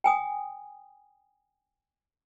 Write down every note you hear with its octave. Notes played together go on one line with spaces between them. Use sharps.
G5 G#5 D#6